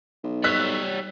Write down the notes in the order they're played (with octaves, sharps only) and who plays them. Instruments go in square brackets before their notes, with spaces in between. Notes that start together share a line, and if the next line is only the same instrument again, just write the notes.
[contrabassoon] B1
[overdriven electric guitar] G3 C#5 [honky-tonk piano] E6 F#6 B6